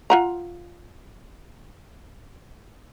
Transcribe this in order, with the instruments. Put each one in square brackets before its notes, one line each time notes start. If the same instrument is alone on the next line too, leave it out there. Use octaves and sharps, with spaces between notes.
[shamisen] F4 F#5 A#5